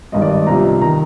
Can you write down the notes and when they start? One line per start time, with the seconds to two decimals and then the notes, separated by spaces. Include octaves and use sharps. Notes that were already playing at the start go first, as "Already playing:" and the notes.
0.12 G#1 G2 D#3 D#5
0.22 D5
0.30 D#5
0.46 C2 C3 F3 A#5
0.81 D#3 A#5